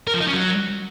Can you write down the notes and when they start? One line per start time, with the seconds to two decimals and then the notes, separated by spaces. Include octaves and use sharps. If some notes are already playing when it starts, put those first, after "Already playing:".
0.08 A#4
0.14 F3
0.21 D#4
0.27 C#4
0.34 F#3